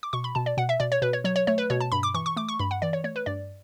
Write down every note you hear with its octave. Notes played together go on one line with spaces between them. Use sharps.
D6
B2 C#6
B5
B2 A5
D5
B2 F#5
E5
B2 D5
C#5
B2 B4
C#5
F#3 C#5
C#5
A3 C#5
B4
B2 C#5
A5
G2 B5
D6
E3 C#6
C#6
A3 D6
C#6
G2 B5
F#5
E3 D5
C#5
A3 C#5
B4
G2 D5